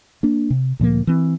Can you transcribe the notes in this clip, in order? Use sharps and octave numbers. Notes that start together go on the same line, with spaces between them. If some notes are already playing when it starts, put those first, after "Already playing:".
A#3 D4
C3
D2 A#2 F3 A#3
E3 C4